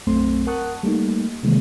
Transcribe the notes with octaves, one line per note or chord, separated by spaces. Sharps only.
B1 F#2 A3 C4 C6
A#4 F#5 A5 C#6 D#6 F#6
G3 A3 A#3 D#4
C3 D#3 E3 G#3 A#3